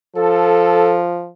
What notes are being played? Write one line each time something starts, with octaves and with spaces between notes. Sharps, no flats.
F3 A4